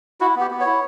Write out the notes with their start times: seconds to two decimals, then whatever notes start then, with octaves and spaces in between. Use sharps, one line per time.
0.21 E4 F#4
0.36 B3 G4
0.51 B3
0.61 C#5
0.66 E4